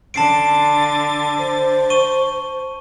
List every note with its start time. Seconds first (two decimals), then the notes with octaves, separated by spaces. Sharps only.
0.14 D3 A5 A6 C7 D7
1.39 C5
1.90 C#6 D#7 G7